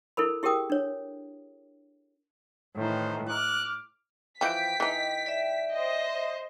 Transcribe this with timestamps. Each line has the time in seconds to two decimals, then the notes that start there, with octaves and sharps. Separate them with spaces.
0.17 E4 A4 A#4 B5
0.43 E4 G4 G#4 A#4 G5 D#6
0.70 D4 C#5
2.77 A2 D#3 E3 C5
3.29 D6 F6 F#6
4.41 E3 F3 G5 G6 B6 D7
4.80 E3 D#4
5.26 D5 E5
5.74 C5 D#5